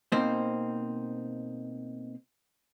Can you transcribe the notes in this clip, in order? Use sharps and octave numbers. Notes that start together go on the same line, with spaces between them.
B2 A#3 C4 D#4 C5